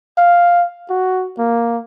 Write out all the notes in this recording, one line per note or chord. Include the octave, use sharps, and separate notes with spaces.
F5
F#4
A#3